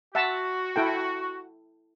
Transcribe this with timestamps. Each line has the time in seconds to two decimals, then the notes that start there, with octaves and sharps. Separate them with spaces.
0.15 F#4 E5 F#5 A5
0.76 E4 A4 G5